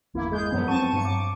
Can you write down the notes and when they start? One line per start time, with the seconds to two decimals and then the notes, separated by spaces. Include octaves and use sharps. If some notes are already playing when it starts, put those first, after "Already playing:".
0.14 G1 E2 A#3 E4
0.30 G#3 G#4 G6
0.52 F#2 F3 F#3 B3
0.68 C4 A5 C#6 D#7
0.93 G2 F#3 C#7
1.05 D6